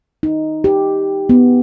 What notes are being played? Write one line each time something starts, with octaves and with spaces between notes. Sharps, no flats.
D#4
G4
B3